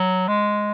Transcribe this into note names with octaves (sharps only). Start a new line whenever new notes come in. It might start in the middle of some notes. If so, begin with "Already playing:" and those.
Already playing: F#3
G#3